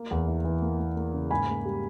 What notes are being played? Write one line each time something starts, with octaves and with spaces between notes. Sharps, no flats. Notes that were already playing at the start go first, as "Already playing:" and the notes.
Already playing: A#3
E2
E3
E3
A#3
A#3
A#3
C#3
G#2 G#5 B5
A#3
G3